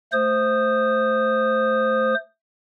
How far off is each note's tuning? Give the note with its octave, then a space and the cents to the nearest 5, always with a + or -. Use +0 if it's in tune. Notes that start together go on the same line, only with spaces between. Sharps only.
A3 +0 C5 +0 D#6 -15